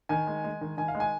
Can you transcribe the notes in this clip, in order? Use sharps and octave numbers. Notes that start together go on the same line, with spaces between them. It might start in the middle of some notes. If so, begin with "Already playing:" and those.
D#3 G#5
G#3
G#3
D#3
D#3 G#5
F5
G#3
G#5